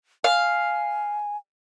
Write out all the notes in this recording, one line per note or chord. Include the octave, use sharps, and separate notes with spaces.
F5 G#5